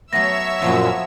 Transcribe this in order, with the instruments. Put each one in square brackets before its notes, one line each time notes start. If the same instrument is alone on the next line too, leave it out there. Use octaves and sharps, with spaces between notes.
[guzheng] F#3 A3 B3 [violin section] C#5 E5 E6 [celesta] A#6
[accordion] F#2 A#2 [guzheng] F3 F#3 B3